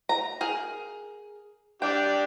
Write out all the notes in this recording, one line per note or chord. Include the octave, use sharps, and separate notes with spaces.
A#5
G#4 A#4
D4 G4 G5